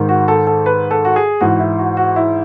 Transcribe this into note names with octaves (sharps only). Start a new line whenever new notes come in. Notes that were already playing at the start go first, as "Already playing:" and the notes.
Already playing: G#2 D#3
F#4
A4
A4
B4
A4
F#4
G#4
G#2 E3 F#4
E4
F#4
F#4
E4